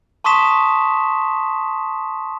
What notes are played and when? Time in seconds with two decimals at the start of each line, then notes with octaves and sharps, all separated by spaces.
0.24 A5 C6 C#6 D#6 B6 E7